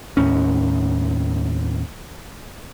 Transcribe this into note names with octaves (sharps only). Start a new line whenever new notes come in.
D#2 A2 C#4